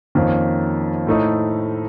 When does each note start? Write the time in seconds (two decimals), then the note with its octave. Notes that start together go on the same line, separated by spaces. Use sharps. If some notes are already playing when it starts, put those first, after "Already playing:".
0.15 F2 D#3 A#3 C#4 F4
1.07 A2 A3 D#4